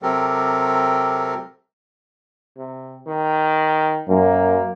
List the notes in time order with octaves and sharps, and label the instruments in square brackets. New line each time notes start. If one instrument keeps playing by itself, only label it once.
[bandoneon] C3 F#3 C4 G4 A4 A#4
[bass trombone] C3
D#3
[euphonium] F#2 [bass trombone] A#3